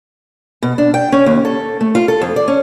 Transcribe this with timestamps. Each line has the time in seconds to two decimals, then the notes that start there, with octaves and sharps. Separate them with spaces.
0.62 B2
0.78 D4
0.94 G5
1.12 C#4
1.26 D#2
1.45 A4
1.81 A3
1.95 F4
2.08 A4
2.22 F2
2.36 D5
2.48 C#4